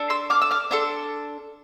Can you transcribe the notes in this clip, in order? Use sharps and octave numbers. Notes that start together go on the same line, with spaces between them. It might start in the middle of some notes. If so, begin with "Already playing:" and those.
Already playing: D4 A4
C6 E6
D6 F6
E6
D6 F6
D4 A4 C6 E6